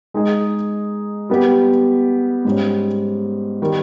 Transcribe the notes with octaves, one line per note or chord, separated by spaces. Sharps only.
G#3 D#4 G#4 D#5
G3 B3 G4
G#2 G3 C#4
D#3 G3